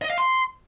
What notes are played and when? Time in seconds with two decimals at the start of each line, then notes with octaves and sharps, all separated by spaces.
0.02 D#5
0.10 F5
0.18 C6